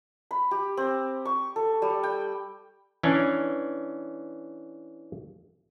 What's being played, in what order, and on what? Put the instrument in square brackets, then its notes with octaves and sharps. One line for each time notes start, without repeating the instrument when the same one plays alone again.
[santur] B5
G4
C4
C#6
A4
G3
G5
[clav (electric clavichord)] E3 C#4 D4